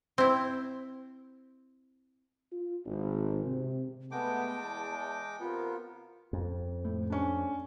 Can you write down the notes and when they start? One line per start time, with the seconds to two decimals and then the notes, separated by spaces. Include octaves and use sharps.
0.18 C4 E4
2.52 F4
2.86 G#1
3.44 C3
4.12 G#3 A3 B3 G5 A5 D6
4.61 E2
5.40 C3 B3 F4 A#4
6.33 F2
6.85 A2
7.10 C#4 D4